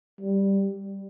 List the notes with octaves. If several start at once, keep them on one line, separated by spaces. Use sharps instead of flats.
G3